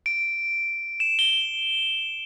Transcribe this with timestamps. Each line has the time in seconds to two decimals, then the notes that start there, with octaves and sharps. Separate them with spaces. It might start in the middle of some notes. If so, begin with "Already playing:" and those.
0.06 D7
1.00 E7
1.19 G7